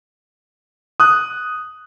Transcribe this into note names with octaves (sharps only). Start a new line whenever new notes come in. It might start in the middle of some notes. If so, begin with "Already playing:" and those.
D#6 F#6